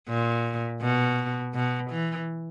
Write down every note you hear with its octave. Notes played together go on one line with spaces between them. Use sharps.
A#2
B2
B2
E3